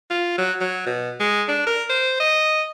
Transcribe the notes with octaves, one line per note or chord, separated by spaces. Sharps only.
F4
F#3
F#3
B2
G#3
D4
A#4
C5
D#5